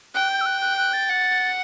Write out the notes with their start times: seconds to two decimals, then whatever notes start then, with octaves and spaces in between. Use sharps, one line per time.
0.14 G5 F#6
0.31 G6
0.41 E6
0.46 F#6
0.61 F#6
0.77 F#6
0.93 A6
1.09 F#5